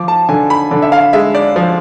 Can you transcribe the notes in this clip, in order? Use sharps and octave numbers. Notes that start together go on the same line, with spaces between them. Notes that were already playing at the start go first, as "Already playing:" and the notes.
Already playing: F3 D6
A5
D3 G#5
B5
D3
E5
F5
G#3 E5
D5
F3